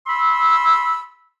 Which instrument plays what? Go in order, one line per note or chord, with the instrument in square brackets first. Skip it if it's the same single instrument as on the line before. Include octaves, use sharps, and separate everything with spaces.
[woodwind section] B5 C6 E6